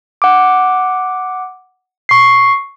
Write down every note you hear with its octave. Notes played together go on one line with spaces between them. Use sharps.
F#5 D6
C#6 C7